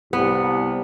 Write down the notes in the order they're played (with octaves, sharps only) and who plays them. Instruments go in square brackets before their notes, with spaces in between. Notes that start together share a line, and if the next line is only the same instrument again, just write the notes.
[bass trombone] C2 [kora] B3